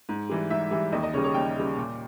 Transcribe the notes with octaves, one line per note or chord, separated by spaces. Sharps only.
G#2
E3 G3
G#2 E5
E3 G3
D#2 D#5
D#5
C#3 G3 C#5
C#5
D#2 G5
C#3 G3
A#2